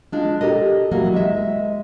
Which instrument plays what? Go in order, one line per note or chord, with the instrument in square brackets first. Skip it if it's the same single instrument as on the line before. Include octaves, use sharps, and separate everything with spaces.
[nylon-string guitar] G#3 D4 F4
G4 A4 A#4 D#5
E3 F#3 G3 A#3
G#3 E5